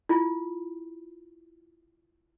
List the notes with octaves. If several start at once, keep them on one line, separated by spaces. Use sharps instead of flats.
E4 F4